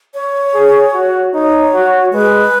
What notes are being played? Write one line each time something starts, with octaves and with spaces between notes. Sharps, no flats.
C#5
G#4
F#4
D#4 C#5
F#4
G#3 B4